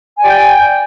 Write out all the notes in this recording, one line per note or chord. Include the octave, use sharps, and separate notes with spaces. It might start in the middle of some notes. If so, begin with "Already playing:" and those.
G4 D5 G5 G#5